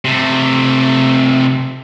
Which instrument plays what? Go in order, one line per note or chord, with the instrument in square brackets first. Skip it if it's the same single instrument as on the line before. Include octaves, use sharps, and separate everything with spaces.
[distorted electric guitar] C3 A3